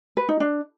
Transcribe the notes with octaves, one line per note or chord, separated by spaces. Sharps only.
B4
D#4
D4